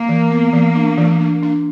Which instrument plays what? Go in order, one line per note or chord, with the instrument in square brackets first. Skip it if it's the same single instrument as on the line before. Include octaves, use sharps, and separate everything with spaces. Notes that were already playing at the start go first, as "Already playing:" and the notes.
Already playing: [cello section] A#3
[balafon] E3
B3
E3
D4
E3
D4
D4